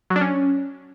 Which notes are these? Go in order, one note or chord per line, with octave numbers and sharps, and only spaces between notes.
F#3
D4
C#4